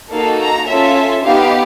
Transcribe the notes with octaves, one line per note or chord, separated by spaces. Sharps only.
A#3 D#4 F#4 A4 F5
A#5
C#4 F4 A4 E5
B3 D#4 G4 F5